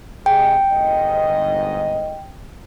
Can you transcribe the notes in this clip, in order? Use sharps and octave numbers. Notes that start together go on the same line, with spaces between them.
C3 G#3 G5
G1 G#2 D#5